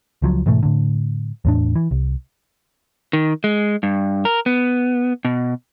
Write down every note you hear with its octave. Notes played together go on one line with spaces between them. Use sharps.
C#2 F3 F#3
G#2 B2 E3 A3
A2 D3
E2 A2 D4
E3
C2
D#3
G#3
G2
A#4
B3
B2